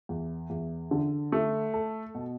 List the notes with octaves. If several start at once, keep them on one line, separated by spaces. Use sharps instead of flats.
E2
E2
D3
A3
A4
B2